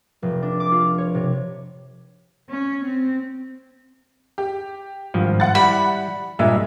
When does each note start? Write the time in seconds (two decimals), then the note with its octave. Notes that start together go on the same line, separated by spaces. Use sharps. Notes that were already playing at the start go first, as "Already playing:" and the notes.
0.22 F1
0.43 D4
0.60 D6
0.72 F4
0.98 C#5
1.15 C3
2.49 C#4
2.85 C4
4.38 G4
5.14 G#1 G2 F3
5.40 F#5 A6
5.55 G3 E4 B5
6.39 G2 A#2 G#3 E5